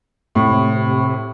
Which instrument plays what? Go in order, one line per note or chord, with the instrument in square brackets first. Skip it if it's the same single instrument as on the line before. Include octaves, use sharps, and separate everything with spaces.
[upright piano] A2 [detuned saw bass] C3